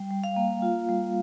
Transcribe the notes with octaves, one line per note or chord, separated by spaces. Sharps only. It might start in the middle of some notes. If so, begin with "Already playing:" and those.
Already playing: G3 G5
G3
F5
A#3
F4
G3